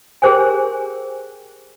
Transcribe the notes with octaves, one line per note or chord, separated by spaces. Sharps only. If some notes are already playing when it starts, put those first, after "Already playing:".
G4 G#4 A#4 C5 G5 G#5